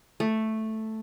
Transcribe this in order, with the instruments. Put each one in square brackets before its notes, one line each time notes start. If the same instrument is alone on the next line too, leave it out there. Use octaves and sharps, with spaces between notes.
[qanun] A3